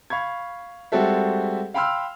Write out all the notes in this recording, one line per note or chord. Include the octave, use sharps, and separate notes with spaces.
F5 B5 C#6 G#6
G3 G#3 C4 F#4 A4 E5
F5 G5 B5 C6 E6 F6